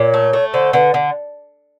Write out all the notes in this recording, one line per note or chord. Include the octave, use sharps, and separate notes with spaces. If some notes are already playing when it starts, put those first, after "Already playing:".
Already playing: A#2 C#5
A3
A3
D3 C5
D3 B4
D3